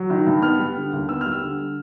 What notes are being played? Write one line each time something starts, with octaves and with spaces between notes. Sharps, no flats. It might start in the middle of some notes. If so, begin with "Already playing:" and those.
Already playing: F#3
D#3
G2
B3 F6
G3
D3
D#2
B3 E6
G3 F6
E6
D3